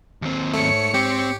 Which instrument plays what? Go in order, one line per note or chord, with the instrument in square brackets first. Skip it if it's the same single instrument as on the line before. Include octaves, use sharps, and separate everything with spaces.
[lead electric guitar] D#2 C4
[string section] G#2 C#5 C#7 [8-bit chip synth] A3
[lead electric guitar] C4 [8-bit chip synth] G4